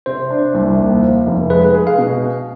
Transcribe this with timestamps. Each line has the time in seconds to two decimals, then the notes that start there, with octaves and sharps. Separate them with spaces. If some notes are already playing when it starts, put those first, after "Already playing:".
0.06 C3 C5
0.30 D4
0.54 C2
0.79 D#2
1.02 F3
1.27 F1
1.50 G#3 B4
1.74 G#4
1.87 F5
1.98 B2